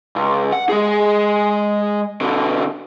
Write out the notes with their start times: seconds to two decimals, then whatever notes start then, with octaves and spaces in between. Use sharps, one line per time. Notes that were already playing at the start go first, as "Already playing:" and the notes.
0.16 C#2
0.52 F#5
0.69 G#3 G#4
2.21 B2 D3